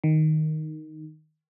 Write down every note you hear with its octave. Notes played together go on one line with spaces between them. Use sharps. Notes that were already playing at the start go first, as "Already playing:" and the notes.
D#3